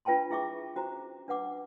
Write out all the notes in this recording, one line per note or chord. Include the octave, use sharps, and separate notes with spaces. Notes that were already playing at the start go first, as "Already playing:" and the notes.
D4 F4 B4 G5 A5 C6
E4 G#4 E5 C#6 D6
C#4 F#4 C5 A#5
D4 B4 F#5 D6